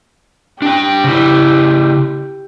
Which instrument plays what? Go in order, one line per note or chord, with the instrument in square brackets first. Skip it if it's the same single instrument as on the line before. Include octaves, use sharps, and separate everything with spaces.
[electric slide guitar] D4 G5 [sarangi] G4
[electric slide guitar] C#3 E4